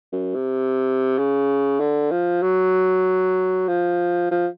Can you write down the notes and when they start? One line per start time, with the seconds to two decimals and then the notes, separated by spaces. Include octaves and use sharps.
0.13 F#2
0.34 C3
1.18 C#3
1.80 D3
2.11 F3
2.42 F#3
3.68 F3
4.31 F3